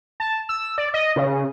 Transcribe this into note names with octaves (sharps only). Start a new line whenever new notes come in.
A5
E6
D5
D#5
C#3